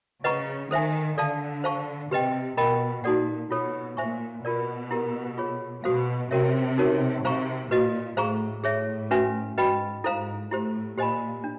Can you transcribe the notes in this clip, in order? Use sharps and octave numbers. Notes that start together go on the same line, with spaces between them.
C#3 B4 D#5 F#5 A#5 C#6
D#3 A4 C5 E5 G#5
D3 A4 D5 F5 A5
C5 F5 A5 C#6
C3 G4 B4 D#5 G5
B2 A#4 D#5 G5 B5
A#2 D#4 F#4 A4 D5 F#5
B2 F4 A4 C#5
A#2 C5 E5 G#5 C#6
B2 F4 A#4 D5
E4 G4 A#4
F4 G#4 C#5
B2 F#4 A4 C5 F5
C3 C#4 F#4 A#4 C#5 E5
D#4 F#4 A#4 C#5
C3 C5 F5 A#5 C#6
A#2 F#4 B4 D#5
A2 G#4 C5 F5 A#5 C#6
A2 G#4 C#5 E5
C#4 F#4 B4 E5 G#5
G#2 F#4 B4 D#5 G5 B5
G#2 E4 A4 C5 F5 A#5
A2 E4 G4 C5
A#2 G4 C5 D#5 G#5 B5
D4